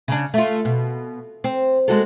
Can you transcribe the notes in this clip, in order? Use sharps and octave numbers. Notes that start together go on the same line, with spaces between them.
C#3 D4
A3 F4
B2
C4
G#3 F#4 A4